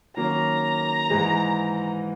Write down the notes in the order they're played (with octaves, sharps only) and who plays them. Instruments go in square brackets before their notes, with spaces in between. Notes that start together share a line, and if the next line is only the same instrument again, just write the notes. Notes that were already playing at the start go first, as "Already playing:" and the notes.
[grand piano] D#3 F#3 A#3 C#4 [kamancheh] A#5
[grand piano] G#2 E3 G#3